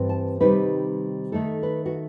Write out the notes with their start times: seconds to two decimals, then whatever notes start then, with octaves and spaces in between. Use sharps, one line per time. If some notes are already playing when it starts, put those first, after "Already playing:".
Already playing: G2 E3 C4
0.09 A5
0.40 C3 D#3 G3 C4 D#4 B4
1.32 D#3 A3 D#4 A4
1.63 B4
1.86 F#4